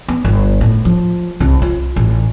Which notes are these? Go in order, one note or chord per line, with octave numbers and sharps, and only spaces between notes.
B3
G1
A2
F3
C2
F4
A1